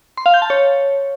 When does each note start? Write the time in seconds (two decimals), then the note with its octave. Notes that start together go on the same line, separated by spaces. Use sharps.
0.17 C6
0.26 F5
0.34 G6
0.42 A5
0.50 C#5